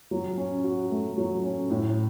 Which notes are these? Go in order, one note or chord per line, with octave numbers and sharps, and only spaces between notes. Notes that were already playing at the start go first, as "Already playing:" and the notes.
F#3
C#4
F#4
A3
F#3
C#4
A2